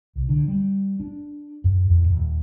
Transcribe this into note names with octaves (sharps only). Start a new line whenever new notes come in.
C2
D3
G3
D4
F#2
F2
D#1